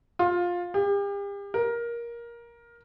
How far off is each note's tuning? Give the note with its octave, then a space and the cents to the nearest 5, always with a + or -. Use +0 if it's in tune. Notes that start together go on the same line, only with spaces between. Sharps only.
F4 +15
G4 +40
A#4 +15